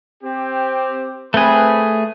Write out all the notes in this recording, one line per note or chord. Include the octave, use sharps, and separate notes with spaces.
C4 G4
A3 C4 G#4 B4